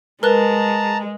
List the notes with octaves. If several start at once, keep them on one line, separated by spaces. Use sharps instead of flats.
G#3 A#4 B4 A5 A#5 F#6